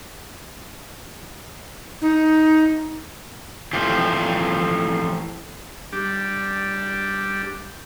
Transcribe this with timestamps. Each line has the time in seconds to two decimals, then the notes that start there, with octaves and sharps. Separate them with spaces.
2.02 D#4
3.73 E3 F3 A3 C4 F4 G4
5.93 G3 D4 G4